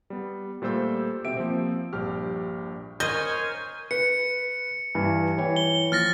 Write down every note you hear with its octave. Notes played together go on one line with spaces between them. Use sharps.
G3 B3
A#2 G3 A3 C5 E6 G6
B2 C4 G4 E5 D7
F3 A#3 C4
A#1 G2 G4 F6
A#4 C5 C#5 D#5 G#5 G6
B4 C#7
G2 E3
E3 C#5 G5
G7
F3 F6 A6 A#6